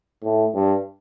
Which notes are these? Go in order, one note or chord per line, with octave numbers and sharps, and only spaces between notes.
A2
G2